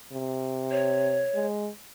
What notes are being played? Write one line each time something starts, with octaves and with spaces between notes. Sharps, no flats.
C3
C#5
G#3